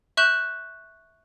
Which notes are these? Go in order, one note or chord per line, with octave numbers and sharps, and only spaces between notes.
E5 C#6 F#6 G6 E7 F#7